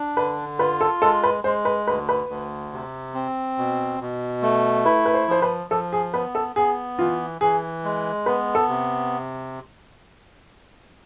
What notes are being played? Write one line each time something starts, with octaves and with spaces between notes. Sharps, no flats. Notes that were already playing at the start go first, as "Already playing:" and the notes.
Already playing: D4
D3 B4
F4 B4
A4
G#3 A4
B4
G#3 C5
B4
D2 B4
B4
D2
C3
C4
B2
B2
A3
E4 B4
B4
C5
F3 C5
B4
F3 A4
G#4
B3 B4
A4
B3 G#4
E3 F4
E3 G#4
G#3
B3 B4
A4
C3